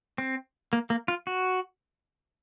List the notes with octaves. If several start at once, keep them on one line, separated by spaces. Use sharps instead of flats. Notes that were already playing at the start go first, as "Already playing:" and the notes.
C4
A#3
A#3
F4
F#4